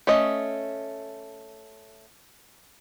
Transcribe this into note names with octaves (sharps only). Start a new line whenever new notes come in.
A3 C#4 D#5